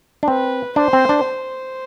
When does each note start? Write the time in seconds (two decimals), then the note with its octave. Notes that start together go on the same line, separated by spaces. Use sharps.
0.23 D4
0.28 C4 B4
0.76 D4 C5
0.93 C4
1.09 D4
1.25 C5